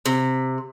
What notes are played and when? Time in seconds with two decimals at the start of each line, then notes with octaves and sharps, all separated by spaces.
0.06 C3